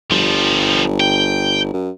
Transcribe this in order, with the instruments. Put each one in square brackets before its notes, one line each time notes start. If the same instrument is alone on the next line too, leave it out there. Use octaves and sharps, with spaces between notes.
[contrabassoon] G1 [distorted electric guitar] F3 G3
[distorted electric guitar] G5
[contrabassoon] F#2